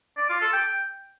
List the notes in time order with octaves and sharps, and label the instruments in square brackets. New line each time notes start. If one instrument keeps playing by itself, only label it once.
[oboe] D5
F4
A4
G5